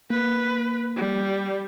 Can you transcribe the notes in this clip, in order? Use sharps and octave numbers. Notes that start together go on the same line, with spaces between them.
A#3 B4
G3